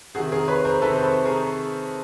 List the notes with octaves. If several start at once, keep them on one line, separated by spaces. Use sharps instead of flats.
C3 D#3 F#4 G#4
G#4 A#4
B4 C#5
A#4 C5
C3 D#3 A4 B4
C5
A4 B4
G#4 A#4